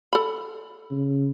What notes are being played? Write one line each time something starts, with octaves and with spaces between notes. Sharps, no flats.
A4 B5
C#3